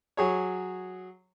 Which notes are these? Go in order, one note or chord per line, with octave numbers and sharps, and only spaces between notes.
F#3 G#4 C#5